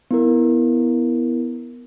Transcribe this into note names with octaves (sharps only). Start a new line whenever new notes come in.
B3 E4 A#4